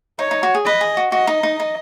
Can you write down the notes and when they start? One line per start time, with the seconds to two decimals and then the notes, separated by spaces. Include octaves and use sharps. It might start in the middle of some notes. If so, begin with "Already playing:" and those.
0.19 D#4 C#5
0.31 D#4
0.43 F#4
0.55 G#4
0.65 B4 D#5
0.81 G#4
0.97 F#4
1.12 F#4 D#5
1.27 D#4
1.43 D#4
1.60 D#4